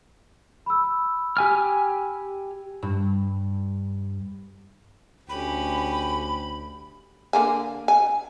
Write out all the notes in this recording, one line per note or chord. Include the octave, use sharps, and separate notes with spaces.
B5 E6
G4 G#5 F6
G2
D2 C#4 G4 B5
D3 A#3 G#5
G#5